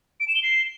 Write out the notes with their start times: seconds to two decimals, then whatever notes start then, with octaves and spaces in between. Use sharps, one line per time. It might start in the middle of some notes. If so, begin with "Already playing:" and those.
0.20 D7
0.28 E7
0.35 G7
0.43 C7